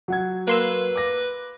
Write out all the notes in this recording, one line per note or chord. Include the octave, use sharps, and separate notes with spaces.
F#3 F#5 G#6
A#3 B4 C6 E6
D6 A#6